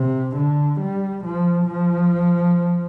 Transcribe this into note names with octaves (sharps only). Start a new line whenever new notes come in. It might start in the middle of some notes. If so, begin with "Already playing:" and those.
Already playing: C3
D3
G3
F3
F3